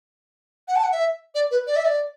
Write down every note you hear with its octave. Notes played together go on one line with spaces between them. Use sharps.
F#5
A5
F#5
E5
D5
B4
D5
E5
D5